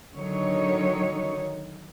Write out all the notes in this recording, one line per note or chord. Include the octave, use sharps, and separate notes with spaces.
D3 D#3 F#3 D#4 C#5